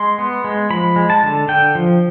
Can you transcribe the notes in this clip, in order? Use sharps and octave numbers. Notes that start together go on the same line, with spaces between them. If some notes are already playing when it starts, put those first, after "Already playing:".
Already playing: G#3 C6
B3
G#3
F3 B5
G#3
A5
D3
D3 G5
F3